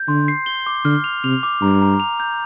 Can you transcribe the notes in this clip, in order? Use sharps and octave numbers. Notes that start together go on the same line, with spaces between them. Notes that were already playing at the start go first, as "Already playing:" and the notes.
Already playing: G6
D3 C6
C7
G7
D6
D3 F6
F7
C3 F7
D6
G2 A#5
A#5
F7
G6